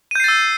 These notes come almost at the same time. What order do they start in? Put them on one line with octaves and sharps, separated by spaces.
D#7 G6 C7 A6 E6